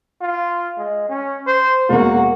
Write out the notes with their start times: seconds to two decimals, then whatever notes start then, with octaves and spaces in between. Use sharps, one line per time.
0.21 F4
0.77 G#3
1.09 C#4
1.47 C5
1.89 E1 A#3 F#4